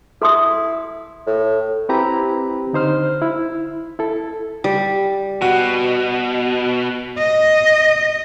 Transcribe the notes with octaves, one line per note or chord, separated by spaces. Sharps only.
E4 A4 C6 D#6
A2
C4 E4 G4 B4 A#5 B5
D3 D#4 C5 F6
E4
E4 A4
G3
B2 F#4
D#5